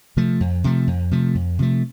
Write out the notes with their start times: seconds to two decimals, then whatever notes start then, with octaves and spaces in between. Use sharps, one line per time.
0.17 C3 F3 A3
0.40 F2
0.64 C3 F3 A3
0.87 F2
1.11 C3 F3 A3
1.35 F2
1.59 C3 F3 A3